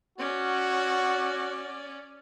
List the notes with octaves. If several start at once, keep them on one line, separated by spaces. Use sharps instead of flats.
C#4 F#4 D5